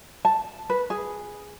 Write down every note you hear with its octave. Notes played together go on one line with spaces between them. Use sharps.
A5
B4
G#4